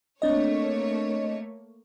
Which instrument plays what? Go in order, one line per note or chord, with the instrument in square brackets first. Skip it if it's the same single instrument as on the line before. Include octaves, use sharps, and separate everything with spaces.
[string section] A3 A#3 C#5 [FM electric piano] C4 D4 D#5